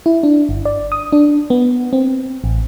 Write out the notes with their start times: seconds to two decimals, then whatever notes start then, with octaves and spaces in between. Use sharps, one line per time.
0.06 E4
0.23 D4
0.49 G1
0.65 D5
0.92 D#6
1.12 D4
1.50 B3
1.93 C4
2.44 A1